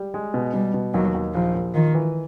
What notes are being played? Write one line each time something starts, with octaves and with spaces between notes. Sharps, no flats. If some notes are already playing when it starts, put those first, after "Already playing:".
Already playing: G3
G#3
B2
B2 G3
B2
D#2 F#3
D#2
A#1 F3
A#1
D#3 F4
E3